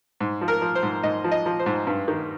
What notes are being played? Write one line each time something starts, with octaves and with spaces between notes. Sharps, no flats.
G#2
F3
A#4
F3
C5
G#2
G#2 D#5
F3
D#5
F3
C5
G#2
G2
D#3